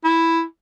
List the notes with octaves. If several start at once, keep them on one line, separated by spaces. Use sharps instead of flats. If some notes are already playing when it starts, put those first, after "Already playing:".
E4